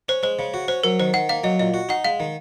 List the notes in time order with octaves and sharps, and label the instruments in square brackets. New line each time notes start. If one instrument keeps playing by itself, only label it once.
[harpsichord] C#4 [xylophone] C5
[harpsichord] G#3 [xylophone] C5
[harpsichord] C#3
F#4
[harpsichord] C#4 [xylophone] C5
[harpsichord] F#3 [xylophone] A#4
[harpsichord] D#3 [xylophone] C5
[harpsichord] D#3 [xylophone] F#5
[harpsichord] A#3 [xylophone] F5
[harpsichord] F#3 [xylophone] D#5
[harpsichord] A#2 [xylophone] D#5
[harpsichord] F#4
[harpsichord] D#4 [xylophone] F#5
[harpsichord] G#3 [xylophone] F5
[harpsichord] D#3